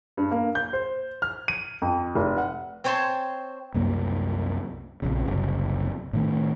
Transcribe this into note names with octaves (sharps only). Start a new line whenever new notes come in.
G2
A#3
G6
C5
F6
D#7
F2
F1
F#5
C4 C5 C#5 G#5 A5 C6
C2 F#2 A#3
A#1 F2 C#3
F#1 C2
A2 D#3 A3